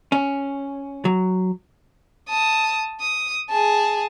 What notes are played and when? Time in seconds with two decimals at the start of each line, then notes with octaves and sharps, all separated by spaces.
0.12 C#4
1.05 F#3
2.29 A5 D#6
3.01 D#6
3.49 G#4 A5